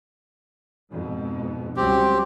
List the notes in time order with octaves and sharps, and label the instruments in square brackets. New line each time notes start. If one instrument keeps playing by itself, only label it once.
[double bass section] F2 G#2 B2
[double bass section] C#2 F#3 G3 [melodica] C4 G4